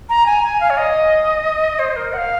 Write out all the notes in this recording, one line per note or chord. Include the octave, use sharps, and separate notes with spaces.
A#5
G#5
G#5
F5
C#5
D#5
C5
A#4
F#5
F5